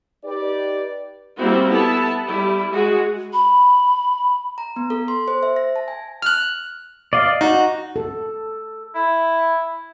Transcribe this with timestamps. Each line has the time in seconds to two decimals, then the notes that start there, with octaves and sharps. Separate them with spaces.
0.24 D#4 G4 B4 D5
1.37 G3 A#3 C4 E4 F#4
1.69 B3 E4 A4 A5
2.27 G3 E4
2.73 G#3 F#4 G#4
3.33 B5
4.58 A#5
4.76 B3
4.90 A4
5.08 C6
5.28 C5
5.43 E5
5.56 A#6
5.76 A5
5.88 G#5
6.22 F6 F#6
7.13 D5 D#5 F5
7.41 D#4 F#4
7.96 A4
8.95 E4